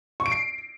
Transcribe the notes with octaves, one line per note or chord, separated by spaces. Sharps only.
C#6
D7
C7